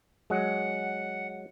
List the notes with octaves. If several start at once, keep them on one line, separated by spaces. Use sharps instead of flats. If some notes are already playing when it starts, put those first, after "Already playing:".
F#3 G#3 F#5